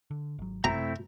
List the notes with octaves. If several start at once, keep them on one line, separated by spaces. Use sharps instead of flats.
D3
G#1 F#3
F#2 C3 A3 C4 E4 A#5